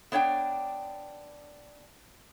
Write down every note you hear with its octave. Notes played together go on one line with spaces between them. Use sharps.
B3 D4 C#5 F#5 G5